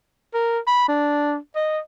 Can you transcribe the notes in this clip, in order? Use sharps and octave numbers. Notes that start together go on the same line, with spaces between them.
A#4
B5
D4
D#5